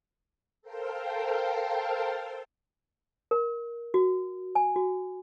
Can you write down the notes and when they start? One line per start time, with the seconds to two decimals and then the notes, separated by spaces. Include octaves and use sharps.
0.62 A4 A#4 C5 F5 G5 A5
3.31 A#4
3.94 F#4
4.55 G#5
4.76 F#4